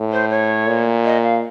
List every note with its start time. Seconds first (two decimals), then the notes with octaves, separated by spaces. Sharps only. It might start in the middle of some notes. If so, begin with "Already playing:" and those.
Already playing: A2
0.12 C5
0.30 C#5
0.67 A#2
1.05 D#5
1.23 F5